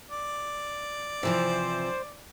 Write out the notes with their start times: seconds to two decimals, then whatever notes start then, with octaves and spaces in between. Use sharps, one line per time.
0.11 D5
1.23 C3 E3 F3 C5